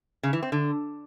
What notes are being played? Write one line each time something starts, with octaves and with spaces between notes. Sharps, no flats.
C#3
E3
C4
D3